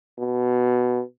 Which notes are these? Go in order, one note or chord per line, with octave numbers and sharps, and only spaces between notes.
B2